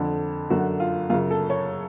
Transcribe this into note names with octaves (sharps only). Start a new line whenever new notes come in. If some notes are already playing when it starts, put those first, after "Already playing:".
Already playing: F2 D3
F#2 D3 F#4
F4
F#2 C#3 F4
A4
C#5